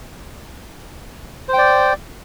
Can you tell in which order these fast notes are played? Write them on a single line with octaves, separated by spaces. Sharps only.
C5 G5 D5